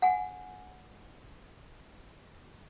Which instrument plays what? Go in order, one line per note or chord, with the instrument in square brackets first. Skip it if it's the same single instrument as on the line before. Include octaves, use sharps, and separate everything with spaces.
[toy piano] F#5 G#5